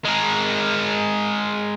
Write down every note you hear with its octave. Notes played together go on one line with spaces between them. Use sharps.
G#3 A#4